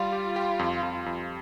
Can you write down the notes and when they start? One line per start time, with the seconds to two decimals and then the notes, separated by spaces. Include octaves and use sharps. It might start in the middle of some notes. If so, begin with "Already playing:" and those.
Already playing: G3 F4
0.12 G4
0.36 G4
0.59 F2
0.83 F2
1.06 F2